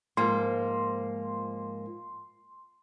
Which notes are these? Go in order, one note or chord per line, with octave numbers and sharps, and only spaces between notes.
G#2 F3 A#3 C6